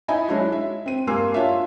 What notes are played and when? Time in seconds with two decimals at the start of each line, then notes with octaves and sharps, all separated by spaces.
0.08 D#4 E4 D#5 E5 G#5 B5
0.28 F#3 G#3 C#4 D4 E4 F#4
0.52 E5
0.86 C4 D#7
1.07 G2 A#3 G#5 C6 E6
1.34 D4 F4 C#5 E5